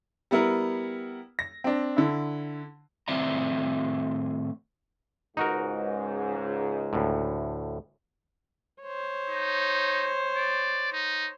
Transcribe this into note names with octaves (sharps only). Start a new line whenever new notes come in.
G3 B3 E4 A#4
A#6
C4 D4
D3 E4
A2 D#3 C4 D5 E5 A#5
C#2 G#2 D#4 F#4 A#4
D2 A2
C5 C#5
D#4
D5
D#4